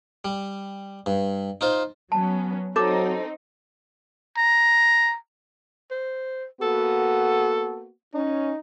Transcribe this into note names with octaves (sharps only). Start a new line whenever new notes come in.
G3
G2
D#4 F4 C5
F#3 B3 C#4 A5
F#3 C4 D#4 A4 C#5 D6
A#5
C5
A#3 B3 F#4 A4
C#4 D#4